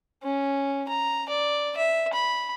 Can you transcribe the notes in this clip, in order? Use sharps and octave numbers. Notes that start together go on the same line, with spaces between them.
C#4
A#5
D5
E5
B5